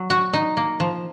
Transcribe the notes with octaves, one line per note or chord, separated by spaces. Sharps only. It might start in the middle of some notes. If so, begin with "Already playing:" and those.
Already playing: F#3
F#4
D#4
A#3
F3